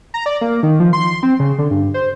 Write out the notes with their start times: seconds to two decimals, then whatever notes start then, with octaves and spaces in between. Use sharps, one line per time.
0.14 A#5
0.26 D5
0.41 A#3
0.63 D#3
0.80 F3
0.93 C6
1.23 C4
1.40 C#3
1.59 D3
1.71 G2
1.94 C5